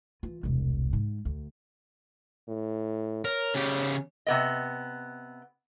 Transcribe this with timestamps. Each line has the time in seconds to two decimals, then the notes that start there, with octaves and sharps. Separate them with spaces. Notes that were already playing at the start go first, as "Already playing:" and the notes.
0.23 E3 F4
0.43 E1 C2
0.93 G#2
1.25 D2
2.48 A2
3.25 A#4 C#5
3.55 C#3 G4
4.26 C3 B3 D#5